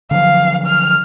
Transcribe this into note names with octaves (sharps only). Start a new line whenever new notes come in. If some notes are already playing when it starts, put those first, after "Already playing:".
D3 F3 F#3 F5
F6